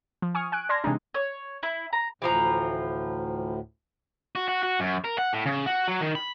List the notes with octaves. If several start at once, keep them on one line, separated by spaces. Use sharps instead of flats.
F3
G#5 C#6 D#6 F6
G#5 F#6 D7
D5 A5 C6 F6 G#6 A#6
C3 E3 G#3 D4 D#4
C#5
E4
A#5
D2 A2 E3 F3 A#5
F#4
F#4
F#4
F#2
A#4
F#5
A2
C#3
F#4
F#3
D#3
B5